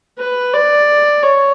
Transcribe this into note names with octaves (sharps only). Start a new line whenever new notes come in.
B4
D5
C#5